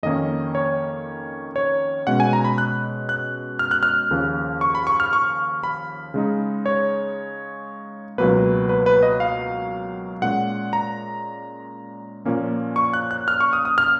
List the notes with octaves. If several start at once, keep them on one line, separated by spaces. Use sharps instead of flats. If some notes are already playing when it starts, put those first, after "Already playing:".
F2 D#3 A#3 C#4 D#5
C#5
C#5
B2 G#3 C#4 F#5
G#5
A#5
B5
F#6
F#6
F6
F#6
F6
D#2 C#3 F3
C#6
B5
C#6
F6
C#6
B5
C#3 G#3 D#4
C#5
C#2 B2 F#3 A#3 B4
B4
B4
D#5
F5
A#2 G#3 C#4 F#5
A#5
A#2 F3 A#3 C#4
C#6
F#6
F#6
F6
C#6
D#6
D#6
F6